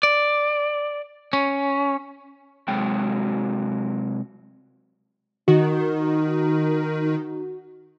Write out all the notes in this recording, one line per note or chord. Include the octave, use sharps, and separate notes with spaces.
D5
C#4
C3 F#3 G#3 F#4 G5
D#3 D#4 F#4